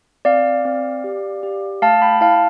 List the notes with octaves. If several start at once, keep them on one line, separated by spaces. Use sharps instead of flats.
C4 D5 F5
C4
G4
G4
A3 F5 A5
G5 B5
E4 F5 A5